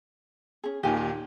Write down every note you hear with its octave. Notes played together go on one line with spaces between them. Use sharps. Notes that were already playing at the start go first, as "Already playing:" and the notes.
C#4 G#4
D#2 A#2 D#3 G4 B4 G#5
G4